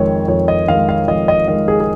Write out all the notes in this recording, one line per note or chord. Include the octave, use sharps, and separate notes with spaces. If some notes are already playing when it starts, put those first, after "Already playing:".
Already playing: F2 D#3 G#3 C#5
F2 C#5
D#5
D#3 G#3 F5
F5
F2 D#5
D#5
D#3 G#3 D#5
G#4
G#4